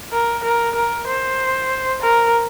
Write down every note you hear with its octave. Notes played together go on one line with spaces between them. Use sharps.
A#4
A#4
A#4
C5
A#4